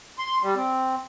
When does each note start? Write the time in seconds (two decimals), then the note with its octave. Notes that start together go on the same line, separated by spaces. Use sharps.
0.19 C6
0.42 G3
0.56 C4